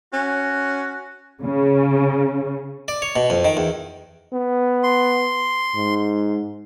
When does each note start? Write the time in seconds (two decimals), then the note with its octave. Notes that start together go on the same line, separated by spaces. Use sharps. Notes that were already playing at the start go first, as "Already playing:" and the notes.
0.13 C#4 F#4
1.43 C#3
2.88 D5
3.02 C#5
3.16 B2
3.30 F2
3.45 D#3
3.57 E2
4.33 B3
4.83 C6
5.75 G#2